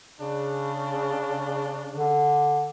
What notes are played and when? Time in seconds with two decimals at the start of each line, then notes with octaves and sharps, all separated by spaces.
0.19 C#3 D4
1.96 D3